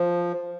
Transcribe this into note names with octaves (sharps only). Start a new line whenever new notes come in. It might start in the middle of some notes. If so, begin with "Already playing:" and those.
Already playing: F3